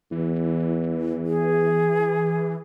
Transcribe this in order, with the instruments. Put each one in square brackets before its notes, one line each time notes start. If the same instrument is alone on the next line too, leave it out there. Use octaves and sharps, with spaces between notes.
[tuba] E2 [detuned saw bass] E3
[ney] G#4